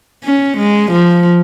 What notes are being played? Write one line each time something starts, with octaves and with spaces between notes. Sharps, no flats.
C#4
G#3
F3